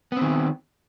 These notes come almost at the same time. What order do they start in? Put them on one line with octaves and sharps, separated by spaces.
B3 C4 D#3